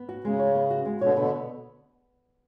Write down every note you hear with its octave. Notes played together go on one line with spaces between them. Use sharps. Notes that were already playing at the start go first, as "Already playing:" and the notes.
Already playing: B3
F#4
C#3 G#3
C#5
B3
F#4
G#3
B2 D3 C#5
B2 D3 B3